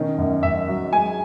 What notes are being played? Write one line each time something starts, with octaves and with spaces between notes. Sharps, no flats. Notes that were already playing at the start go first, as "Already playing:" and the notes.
Already playing: B2 D#3 C#4
F#2
F#2 E5
F#3
G#3 G#5